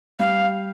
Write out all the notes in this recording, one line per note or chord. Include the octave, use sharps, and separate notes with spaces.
G3 F5